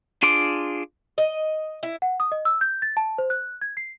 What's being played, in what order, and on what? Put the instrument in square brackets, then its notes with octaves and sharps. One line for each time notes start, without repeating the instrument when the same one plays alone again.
[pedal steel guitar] D4 F4 G#4 C6 D6
[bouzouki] D#5
E4
[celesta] F#5
D#6
D#5
E6
G6
A6
A5
C5
F#6
G#6
C7